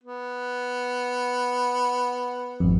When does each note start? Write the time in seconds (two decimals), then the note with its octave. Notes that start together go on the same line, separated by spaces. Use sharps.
0.03 B3
2.60 G#1 F2